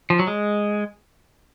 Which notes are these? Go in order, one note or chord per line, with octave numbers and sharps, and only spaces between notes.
F3
F#3
G#3